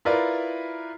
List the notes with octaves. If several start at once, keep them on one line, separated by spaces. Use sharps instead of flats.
E4 F4 A#4 B4 D5